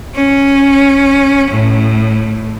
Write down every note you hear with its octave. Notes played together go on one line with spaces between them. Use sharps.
C#4
A2